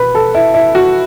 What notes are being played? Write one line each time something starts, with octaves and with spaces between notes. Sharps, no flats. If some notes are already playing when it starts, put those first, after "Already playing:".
Already playing: B2 B4
A4
E4
E4
F#4